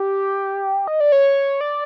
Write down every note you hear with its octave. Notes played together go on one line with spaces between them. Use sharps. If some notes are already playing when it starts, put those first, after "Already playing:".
Already playing: G4
D#5
D5
C#5
D5